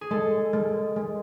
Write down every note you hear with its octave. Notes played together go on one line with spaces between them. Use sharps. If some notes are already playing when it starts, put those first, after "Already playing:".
G#4
G#3 A4
G#3
G#3